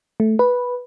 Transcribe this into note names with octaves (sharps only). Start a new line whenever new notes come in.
A3
B4